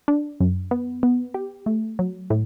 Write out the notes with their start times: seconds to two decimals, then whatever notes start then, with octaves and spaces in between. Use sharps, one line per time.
0.08 D4
0.40 F#2
0.71 B3
1.03 B3
1.34 G4
1.66 A3
1.99 F#3
2.30 A2